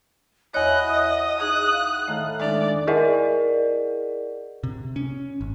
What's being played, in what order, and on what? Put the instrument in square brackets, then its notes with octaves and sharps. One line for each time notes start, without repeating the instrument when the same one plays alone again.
[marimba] E2 C#5 [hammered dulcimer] E4 F#4 [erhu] D#5 [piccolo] F#6
[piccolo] D#6
[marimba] D#4 G#4 [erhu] F#6
[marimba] F5
[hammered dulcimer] A2 F5 A#5 [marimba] D#3 A3
[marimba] G#3 D4 D#4 [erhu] D5
[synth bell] E4 G#4 A#4 D5 D#5 F#5
[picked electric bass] C3
C#4
G#1